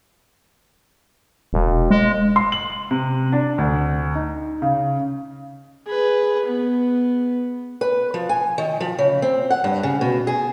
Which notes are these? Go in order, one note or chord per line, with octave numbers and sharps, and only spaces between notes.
E1
G#3
C6
F#7
C3
D4
D2
D#4
C#3
G#4 B4
B3
B4
F3
G#5
D#3
F3
C#3
C4
F#5
G2
C#3
B2
G#4